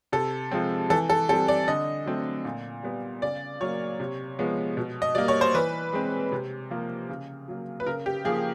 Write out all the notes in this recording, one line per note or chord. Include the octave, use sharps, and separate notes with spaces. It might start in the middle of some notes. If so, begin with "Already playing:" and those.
C3 A4
F3 G#3 C4
E3 A4
A4
G3 C4 A4
D5
D3 D#5
F#3 A3 C4
A#2
G3 B3
C#3 D5
F#3 A#3 C#5
C3
F3 G#3 B3
B2
D#5
G3 A#3 D5
C#5
C5
E3 B4
G#3 C4
C3
F3 A#3
C#3
F#3 A#3
B4
C#3 A#4
G4
F3 A#3 G#4